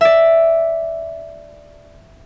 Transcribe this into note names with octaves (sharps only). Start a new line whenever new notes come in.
D5 E5